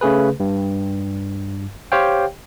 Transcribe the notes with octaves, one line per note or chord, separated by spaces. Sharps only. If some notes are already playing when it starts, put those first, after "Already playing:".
C#3 A3 G#4 B4
G2
G4 C5 C#5 F5 G5